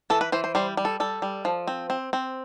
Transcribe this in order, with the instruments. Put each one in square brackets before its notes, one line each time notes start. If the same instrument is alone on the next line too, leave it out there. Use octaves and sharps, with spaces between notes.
[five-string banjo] E3 A4
B4
E3 C5
C5
G3 C5
G3
A4
G3 A4
G3
F3
C4
C4
C4